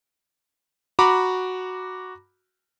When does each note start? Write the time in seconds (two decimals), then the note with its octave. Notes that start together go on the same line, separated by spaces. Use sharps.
0.99 F#4 A#5 B5 D6